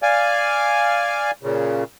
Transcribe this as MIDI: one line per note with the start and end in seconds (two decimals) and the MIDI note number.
0.03 1.31 74
0.03 1.31 77
0.03 1.31 80
1.43 1.84 46
1.43 1.84 49